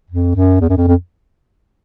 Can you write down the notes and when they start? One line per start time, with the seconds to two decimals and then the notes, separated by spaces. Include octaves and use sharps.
0.10 F2
0.36 F#2
0.61 E2
0.69 F#2
0.77 F2
0.87 F2